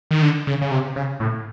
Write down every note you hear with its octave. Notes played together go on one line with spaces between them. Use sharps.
D#3
D3
C#3
C#3
C3
C#3
A2